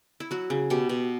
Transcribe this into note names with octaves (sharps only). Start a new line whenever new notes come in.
E4
F#3 F#4
C#3
B2 G4
B2